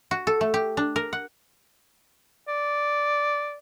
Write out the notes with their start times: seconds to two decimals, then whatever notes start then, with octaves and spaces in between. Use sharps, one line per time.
0.11 F#4
0.27 A4
0.41 A3
0.54 G4
0.77 D4
0.96 A#4
1.13 F#5
2.48 D5